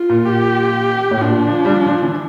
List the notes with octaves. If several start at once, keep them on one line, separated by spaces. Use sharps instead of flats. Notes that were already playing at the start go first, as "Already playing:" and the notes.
Already playing: F4
A#2
G4
A2
A#2 D4
F3
G3
F3
F3
E3